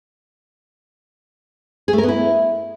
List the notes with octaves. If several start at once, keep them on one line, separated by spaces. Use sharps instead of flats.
G#4
A3
A#4
B3
E4